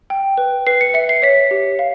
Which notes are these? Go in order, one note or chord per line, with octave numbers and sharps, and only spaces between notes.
G5
B4
B4 C7
C#7
E5 C#7
C7
C#5 B6
G4
F5